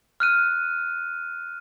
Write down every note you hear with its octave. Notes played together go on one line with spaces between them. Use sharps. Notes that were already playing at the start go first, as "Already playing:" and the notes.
F6 F#6 D#7